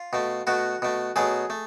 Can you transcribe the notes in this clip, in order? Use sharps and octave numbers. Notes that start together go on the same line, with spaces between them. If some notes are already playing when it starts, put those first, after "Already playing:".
Already playing: F4
B2 A3
B2 A3 F#4
B2 A3
B2 F#3 A3 G#4
A3